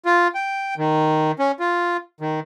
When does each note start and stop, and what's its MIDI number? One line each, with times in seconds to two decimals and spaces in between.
0.05 0.28 65
0.35 0.74 79
0.77 1.32 51
1.39 1.52 61
1.60 1.97 65
2.20 2.40 51